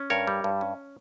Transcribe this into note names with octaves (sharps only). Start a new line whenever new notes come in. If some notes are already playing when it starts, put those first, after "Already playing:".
Already playing: C#4
G2 A#4 C#5
G3
G2
C#4